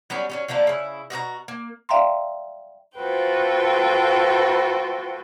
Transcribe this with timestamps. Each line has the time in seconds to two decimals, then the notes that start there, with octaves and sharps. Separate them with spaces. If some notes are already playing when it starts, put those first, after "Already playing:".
0.10 F#3 G3 B3 C#4
0.29 F#3 G3 C#4
0.48 D3 F3 A3 A#3
0.67 C#3 E4
1.10 B2 F#4 G#4 A#5
1.48 A#3
1.89 D5 E5 F5 G5 A#5 C6
2.97 F4 F#4 A4 B4 C5 G5